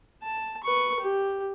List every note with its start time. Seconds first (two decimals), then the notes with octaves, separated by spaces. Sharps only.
0.23 A5
0.64 B4 C#6
1.00 G4